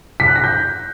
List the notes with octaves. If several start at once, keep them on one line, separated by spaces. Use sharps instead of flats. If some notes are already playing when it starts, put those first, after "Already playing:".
B6
F#6
A#6
G6